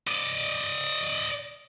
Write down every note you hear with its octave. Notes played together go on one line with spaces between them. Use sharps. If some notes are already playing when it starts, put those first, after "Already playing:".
D5 D#5